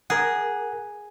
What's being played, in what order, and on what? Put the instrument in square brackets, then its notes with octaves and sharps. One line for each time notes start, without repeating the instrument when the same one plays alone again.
[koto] G#4 [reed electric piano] A#4 F#5